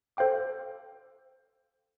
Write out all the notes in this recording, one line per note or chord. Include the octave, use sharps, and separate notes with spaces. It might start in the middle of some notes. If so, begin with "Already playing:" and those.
A4 C5 F5 G5 D6